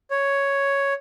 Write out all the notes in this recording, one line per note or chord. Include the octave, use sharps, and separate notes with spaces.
C#5